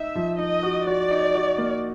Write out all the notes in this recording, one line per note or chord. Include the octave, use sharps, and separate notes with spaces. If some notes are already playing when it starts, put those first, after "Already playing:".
Already playing: D#4 E5
F3
D#4 D#5
F#4
F#4 D5
D#4
F#4
A#3